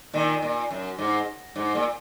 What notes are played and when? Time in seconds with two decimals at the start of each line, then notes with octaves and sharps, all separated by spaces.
0.13 A#2 D#3
0.43 A#2
0.71 F#2
0.98 G#2
1.56 G#2
1.75 A#2